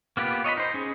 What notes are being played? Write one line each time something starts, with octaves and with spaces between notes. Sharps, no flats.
A#3 B3 F4 G4 B4
C#5 D#5 A5 B5
D#4 C5
C#4 G#4